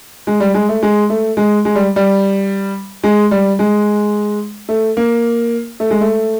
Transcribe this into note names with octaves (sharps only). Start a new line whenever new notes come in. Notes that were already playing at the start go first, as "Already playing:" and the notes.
G#3
G3
G#3
A3
G#3
A3
G#3
G#3
G3
G3
G#3
G3
G#3
A3
A#3
A3
G#3
A3